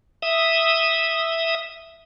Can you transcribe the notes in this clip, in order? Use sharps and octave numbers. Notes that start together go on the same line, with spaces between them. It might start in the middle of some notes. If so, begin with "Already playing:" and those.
E5 D#6